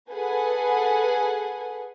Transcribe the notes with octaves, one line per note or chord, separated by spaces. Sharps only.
G#4 A4 B4 F#5 G#5